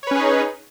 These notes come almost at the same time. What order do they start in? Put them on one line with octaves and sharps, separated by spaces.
C#5 B4 C#4 G#4 D#4